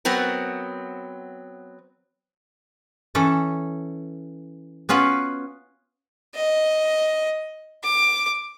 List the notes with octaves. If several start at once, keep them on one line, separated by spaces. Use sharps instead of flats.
F#3 B3 C4 A#4
E3 C#4 A4
B3 C#4 F4 F#4 B4
D#5
D6